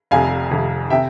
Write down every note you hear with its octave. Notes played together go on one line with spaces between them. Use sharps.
F1 F2 C3 F5 G#5
F1 F2 C3
C3 E5 G5